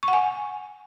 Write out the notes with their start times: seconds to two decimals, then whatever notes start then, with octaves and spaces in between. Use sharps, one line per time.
0.03 C#6
0.08 F#5
0.13 G#5